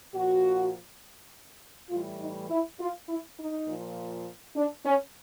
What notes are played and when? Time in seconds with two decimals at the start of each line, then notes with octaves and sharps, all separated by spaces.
0.13 A#2 F3 F#4
1.90 A2 E3 G3 F4
2.20 D#4
2.50 E4
2.79 F4
3.08 E4
3.38 D#4
3.67 A#2 F3
4.56 D4
4.85 C#4